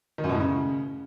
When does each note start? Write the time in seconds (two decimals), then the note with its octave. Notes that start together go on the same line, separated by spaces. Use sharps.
0.18 D#3
0.24 F#2
0.29 B2
0.35 A2
0.40 C#3